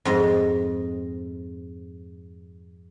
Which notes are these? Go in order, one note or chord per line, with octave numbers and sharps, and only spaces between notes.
F2 G#2 D#5